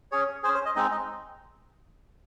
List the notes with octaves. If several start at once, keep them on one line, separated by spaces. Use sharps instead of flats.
C#4 G#4 C#5
C#4 G#4 C5
C5
D#5
G#3 C4 D#4 D#5
D#5